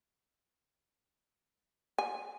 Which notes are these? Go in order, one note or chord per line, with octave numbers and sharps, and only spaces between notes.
G#5